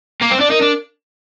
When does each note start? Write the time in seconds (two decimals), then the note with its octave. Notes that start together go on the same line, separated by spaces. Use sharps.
0.21 A#3
0.31 C4
0.40 D4
0.50 D#4 A#4
0.61 D4